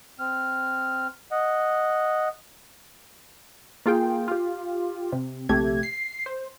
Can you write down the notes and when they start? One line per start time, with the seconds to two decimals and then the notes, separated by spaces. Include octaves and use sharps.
0.19 C4 F6
1.32 D#5 F#5
3.86 A#3 F4 G#4 G5
4.28 F4 G4
5.12 C3
5.49 A#1 C3 A3 G4 G#6
5.83 C7
6.26 C5